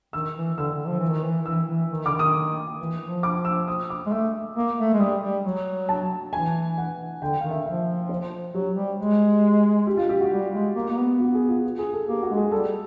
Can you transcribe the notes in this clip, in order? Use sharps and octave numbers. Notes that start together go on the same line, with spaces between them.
D#3 E6
E3
D3 E6
D3
F3
E3
D#3
E3
E3 E6
E3
D#3
D3 D6
D#3
D#6
E3
F3
D6
E6
D#6
D6
G#3
A3 E6
A#3
A3
G#3
G3 D#6
G3
F#3
A5
E3 G#5
F#5
D3 G5
D#3 F5
E5
F3 E5
C5
F#3 G4
G3
G#3
G4
F4
G4
F#4
G3
G#3
A#3
A#3
B3
F#4
G#4
F4
G#4
A4
A#3 G4
F#4
G#3
G#4
G3 A4